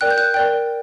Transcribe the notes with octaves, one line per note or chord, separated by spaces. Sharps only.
A#4 D5 G5 F#6
G6
F#6
A#4 D5 G5